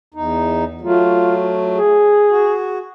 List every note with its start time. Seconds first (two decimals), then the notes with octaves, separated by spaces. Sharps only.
0.14 E2 D#4
0.82 F#3 A3 F4
1.74 G#4
2.30 F#4